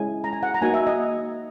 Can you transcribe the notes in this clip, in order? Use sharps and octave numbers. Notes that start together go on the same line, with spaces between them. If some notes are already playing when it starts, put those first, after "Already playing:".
Already playing: G#3 C#4 E4 G#5
A#5
G#5
F#5
A#5
A#3 D#4 F#4 G#5
E5
D#5